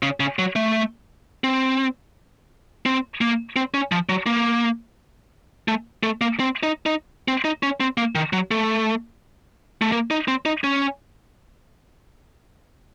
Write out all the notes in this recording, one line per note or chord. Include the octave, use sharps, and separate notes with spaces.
C#3
C#3
F#3
A3
C4
C4
A#3
C4
C#4
F3
F#3
A#3
A3
A3
A#3
C4
D#4
D#4
C4
D#4
C#4
C4
A#3
D#3
F#3
A3
A3
A#3
D#4
C4
D#4
C#4